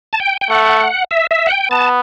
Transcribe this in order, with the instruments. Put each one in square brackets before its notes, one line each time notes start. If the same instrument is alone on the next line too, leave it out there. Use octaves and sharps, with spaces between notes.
[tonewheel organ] A5
G5
G5
[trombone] A3 [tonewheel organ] F#5
[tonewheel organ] E5
E5
F#5
G5
[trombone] B3 [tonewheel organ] A5